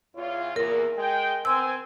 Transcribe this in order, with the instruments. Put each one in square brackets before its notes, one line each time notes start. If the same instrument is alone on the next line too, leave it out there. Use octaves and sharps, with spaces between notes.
[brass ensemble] E2 F4 C#5
[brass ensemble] E2 A#2 [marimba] A#4
[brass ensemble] G#3 G5
[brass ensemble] B3 C4 G#5 [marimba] C6 E6